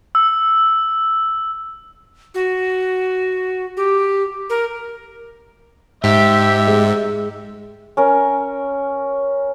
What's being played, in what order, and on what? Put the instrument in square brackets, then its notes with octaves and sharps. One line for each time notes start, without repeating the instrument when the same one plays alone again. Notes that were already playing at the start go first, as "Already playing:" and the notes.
[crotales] E6
[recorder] F#4
G4
A#4
[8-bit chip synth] G#2 [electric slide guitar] G4 [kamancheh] E5
[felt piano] G#3
[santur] C#4 A#4